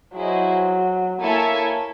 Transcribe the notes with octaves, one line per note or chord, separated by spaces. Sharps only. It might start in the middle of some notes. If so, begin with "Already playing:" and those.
F#3 E4 G#4 C5 D#5
A#3 E4 A4 C#5 E5 G#5